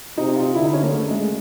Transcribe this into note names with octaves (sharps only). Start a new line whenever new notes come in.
C3 D#4
F4
D3 E4
D#4
C#4
A#3
C#3 A3
G#3